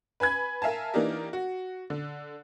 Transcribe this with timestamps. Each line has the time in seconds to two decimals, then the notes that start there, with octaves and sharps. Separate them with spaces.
0.20 B4 G#5 B5 G#6
0.62 A#4 E5 F5 G#5 A5
0.94 E3 A#3 D4 D#4 G4 A#4
1.33 F#4
1.90 D3